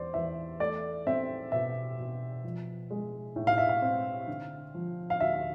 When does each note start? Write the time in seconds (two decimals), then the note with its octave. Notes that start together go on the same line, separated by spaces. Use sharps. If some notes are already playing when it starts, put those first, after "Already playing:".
Already playing: E2 C5 D5
0.14 E2 E5
0.60 A3 D5
1.07 C4 E5
1.52 B2 E5
1.99 B2
2.44 F3
2.91 G#3
3.36 A2
3.47 F5
3.58 E5
3.69 F5
3.82 C4
4.27 D3
4.74 F3
5.10 F5
5.20 D2 E5